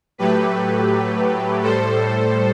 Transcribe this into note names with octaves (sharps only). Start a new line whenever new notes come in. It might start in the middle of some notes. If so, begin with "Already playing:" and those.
A2 F#3 A3 G4 B4
A2 G3 A4 C5